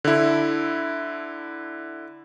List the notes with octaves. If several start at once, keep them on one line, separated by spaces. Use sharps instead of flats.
D3 E4